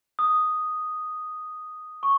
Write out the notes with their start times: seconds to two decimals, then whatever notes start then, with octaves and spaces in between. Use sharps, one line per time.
0.19 D#6
2.03 C#6